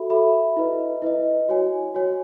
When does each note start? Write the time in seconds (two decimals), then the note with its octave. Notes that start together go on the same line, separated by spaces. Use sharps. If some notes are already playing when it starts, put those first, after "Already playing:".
Already playing: F#4 A4 E5 B5
0.10 F#4 A4 E5 B5
0.56 E4 B4 D#5
1.02 E4 B4 D#5
1.49 F#4 C#5 G#5
1.95 F#4 C#5 G#5